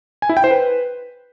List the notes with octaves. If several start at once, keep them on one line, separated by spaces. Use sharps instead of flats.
G#5
E4
G5
C5
B4